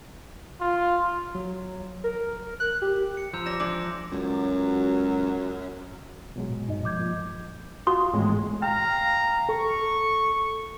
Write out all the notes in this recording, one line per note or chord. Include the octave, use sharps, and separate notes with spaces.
F4
F#3
A#4
F#6
G4
C#7
F3 A#5 E6 G6
E3 G3 C#5 A#6 E7
E3 G#3 D4 D6
C#2 F#2 F#3
B2 F#3 G#3
A#2
G2 D#4 D#5
F3 D6 G6 G#6
A#2
F4 F#4 C6 D#6
G#1 E2 A2 G#3
F5 G5 A#5 F6
A4 C#6